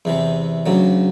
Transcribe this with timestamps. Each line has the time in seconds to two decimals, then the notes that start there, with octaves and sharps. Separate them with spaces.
0.05 E2 C3 E3
0.66 D2 C#3 F#3